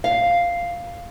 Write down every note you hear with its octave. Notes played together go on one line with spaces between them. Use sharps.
F5